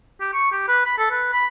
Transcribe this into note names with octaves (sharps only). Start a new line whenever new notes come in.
G4
C#6
G4
B4
B5
A4
B4
B5